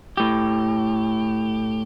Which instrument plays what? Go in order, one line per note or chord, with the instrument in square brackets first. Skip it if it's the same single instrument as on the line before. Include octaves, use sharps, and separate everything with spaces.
[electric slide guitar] A2 G4